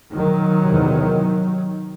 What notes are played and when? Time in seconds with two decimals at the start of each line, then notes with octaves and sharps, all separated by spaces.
0.12 D#3 F#3
0.65 E2 C3